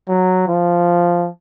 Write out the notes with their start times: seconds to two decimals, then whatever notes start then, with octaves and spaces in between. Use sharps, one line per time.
0.09 F#3
0.48 F3